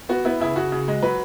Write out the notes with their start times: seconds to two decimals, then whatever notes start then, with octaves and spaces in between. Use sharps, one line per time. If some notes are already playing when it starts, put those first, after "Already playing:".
0.09 B3 F#4
0.25 B3 E4
0.40 C#3 E4
0.56 C#3 F#4
0.72 C#3
0.88 G#3
1.03 F#3 B4